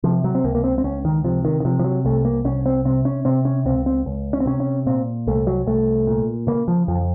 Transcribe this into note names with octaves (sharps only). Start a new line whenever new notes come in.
C3 F3
F#3
C4
C#2 A#3
A#3
C4
C4
C#2 C#4
D#3
C3 F3
D#3
D#3
C3 F3
F3
F#3
C2 A3
A#3
C2 C#4
C4
C3 C4
C#4
C3 C4
C#4
C#2 C4
C4
C#2
C#4
C4
C3 C#4
C#4
A#2 C4
C2 A3
F#3
C2 A3
A#2
C#3 A#3
F3
F2 F3